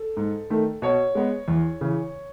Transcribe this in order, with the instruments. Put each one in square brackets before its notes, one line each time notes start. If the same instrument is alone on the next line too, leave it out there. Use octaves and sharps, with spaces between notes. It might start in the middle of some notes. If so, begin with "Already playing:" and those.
Already playing: [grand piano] A4
G#2
D#3 A3
B2 C#5
G#3 B3
E2
C#3 E3